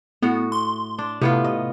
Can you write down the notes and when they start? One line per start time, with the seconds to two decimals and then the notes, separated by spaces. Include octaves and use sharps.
0.22 A2 B3 F#4
0.52 C6
0.99 D4
1.21 A2 C3 B3 F4
1.44 D#5